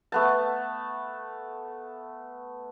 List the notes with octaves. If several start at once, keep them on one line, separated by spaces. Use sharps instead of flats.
A3 B3 A5